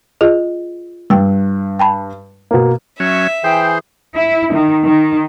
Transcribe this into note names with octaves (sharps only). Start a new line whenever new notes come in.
F4 G#4 D#5
G2 G5 E6
G5 A5 B5
B2 A#3
F#3 C#4 E5
E3 G#4 C5 G5
E4
D#3
D#3